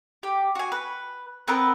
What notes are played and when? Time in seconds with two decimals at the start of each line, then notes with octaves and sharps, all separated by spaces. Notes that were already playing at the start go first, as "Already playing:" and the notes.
0.23 G4
0.55 F#4 G#5
0.72 B4
1.48 B3 C4 A#4 B4